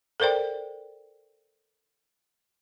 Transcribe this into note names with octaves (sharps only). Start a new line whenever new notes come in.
A4 A#4 C5 D5 G5